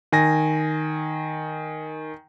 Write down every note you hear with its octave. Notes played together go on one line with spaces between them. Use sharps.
D#3 G#5 A#6